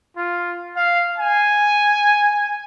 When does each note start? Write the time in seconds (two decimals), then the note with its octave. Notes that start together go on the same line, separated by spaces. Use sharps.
0.17 F4
0.76 F5
1.18 G#5